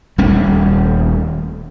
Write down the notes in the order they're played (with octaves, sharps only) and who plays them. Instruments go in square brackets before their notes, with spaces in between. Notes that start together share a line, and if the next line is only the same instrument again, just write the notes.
[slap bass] D#1 G3 A3 C#4